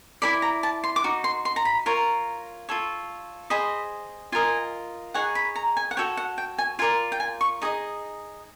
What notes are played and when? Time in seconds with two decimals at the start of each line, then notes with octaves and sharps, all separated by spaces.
0.22 E4 A4 D5 B5
0.42 A#5
0.63 A5
0.84 C6
0.96 D6
1.04 D#4 F#4
1.24 C6
1.45 C6
1.56 A#5
1.65 B5
1.86 F4 A#4 C#5 A#5
2.69 F4 A4 C#5
3.50 G#4 C5 D#5 B5
4.32 F4 A#4 D#5 G#5
5.14 D#4 G#4 C#5 F#5
5.35 B5
5.56 A#5
5.77 G#5
5.91 F#5
5.97 F#4 A4 C#5 G5
6.17 F#5
6.38 G5
6.58 G#5
6.79 F4 A#4 D5 G#5
7.12 G5
7.20 G#5
7.41 C#6
7.62 D#4 G#4 D#5